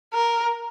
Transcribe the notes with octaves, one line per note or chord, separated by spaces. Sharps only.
A#4